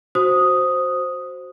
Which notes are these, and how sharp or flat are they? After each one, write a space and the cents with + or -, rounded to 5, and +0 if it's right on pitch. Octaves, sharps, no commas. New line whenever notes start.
F#4 +0 C5 +5 D#6 +0